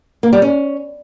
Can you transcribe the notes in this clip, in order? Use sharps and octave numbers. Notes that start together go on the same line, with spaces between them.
A#3
G3
C#4